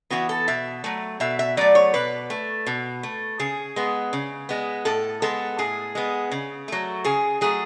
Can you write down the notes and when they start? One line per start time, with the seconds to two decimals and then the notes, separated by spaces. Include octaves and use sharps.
0.10 E3 B3 F#4
0.29 A4
0.48 B2 E5
0.84 F#3 A3
1.20 B2 E5
1.39 E5
1.57 F#3 A3 D5
1.75 C#5
1.94 B2 B4
2.30 A3
2.67 B2
3.03 A3
3.39 C#3 G#4
3.76 G#3 B3
4.13 C#3
4.49 G#3 B3
4.85 A2 A4
5.22 G#3 B3 A4
5.59 A2 G#4
5.95 G#3 B3
6.32 C#3
6.68 F#3 A3
7.04 C#3 G#4
7.41 F#3 A3 G#4